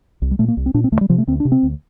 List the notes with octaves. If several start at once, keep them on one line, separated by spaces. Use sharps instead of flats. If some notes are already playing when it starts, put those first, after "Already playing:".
C2
G3
A#2 A3
A#3
C2
C4
A#2 D4
C4
D2 A3
G3
C3 F3
A3
D2 C4
D4
C3
C4
D2